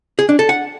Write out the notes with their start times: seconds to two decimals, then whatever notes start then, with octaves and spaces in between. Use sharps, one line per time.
0.19 G#4
0.29 D4
0.39 A4
0.49 F#5